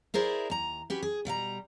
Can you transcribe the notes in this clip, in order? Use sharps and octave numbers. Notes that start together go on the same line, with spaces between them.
E4 G#4 A#4 C5 D5
D#2 A#5
C#4 F#4 G4 B4
G#4
B2 G3 F5 A#5